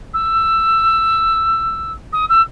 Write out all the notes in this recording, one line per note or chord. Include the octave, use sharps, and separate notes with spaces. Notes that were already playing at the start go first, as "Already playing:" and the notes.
E6
D#6
E6